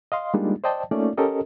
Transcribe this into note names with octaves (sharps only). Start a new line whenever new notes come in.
D#5 F5 C6
G3 G#3 A#3 D4 D#4 F4
C5 D5 D#5 G5 A5
A3 A#3 C#4 D#4 F4 D5
C#4 G4 A4 A#4 D#5